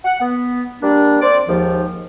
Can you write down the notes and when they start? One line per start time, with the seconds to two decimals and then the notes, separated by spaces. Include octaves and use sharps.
0.04 F#5
0.20 B3
0.82 G3 A#3 D4
1.22 C4 C5 D5
1.47 D#2 G#2 F3